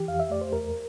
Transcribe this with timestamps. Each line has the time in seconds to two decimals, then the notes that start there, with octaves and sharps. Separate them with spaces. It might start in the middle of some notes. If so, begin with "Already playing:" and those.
Already playing: E3 G4
0.08 F2 F5
0.20 E5
0.30 A3 D5
0.41 C5
0.53 E2 A#4